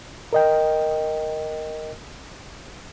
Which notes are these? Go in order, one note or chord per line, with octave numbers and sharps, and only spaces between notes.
A#4 D#5 G5